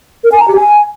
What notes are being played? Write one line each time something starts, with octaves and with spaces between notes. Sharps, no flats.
A#4
G#5
A#5
G4
G#5